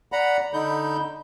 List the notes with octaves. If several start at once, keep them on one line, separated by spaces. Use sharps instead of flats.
D5 F#5 A#5 B5
D3 D#4 B5 G6